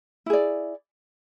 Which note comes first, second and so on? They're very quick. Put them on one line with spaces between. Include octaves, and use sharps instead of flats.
E4 G#4 D5